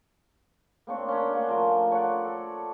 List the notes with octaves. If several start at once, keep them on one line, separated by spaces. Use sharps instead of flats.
A#3 C4 D4 C#5
C#4 D4
A#3 F#5 G#5 C6
F3 A3 A#4
C#5 D5 F#5
A4